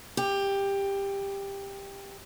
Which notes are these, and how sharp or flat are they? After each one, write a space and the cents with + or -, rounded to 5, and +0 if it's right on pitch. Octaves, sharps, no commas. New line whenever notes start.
G4 +15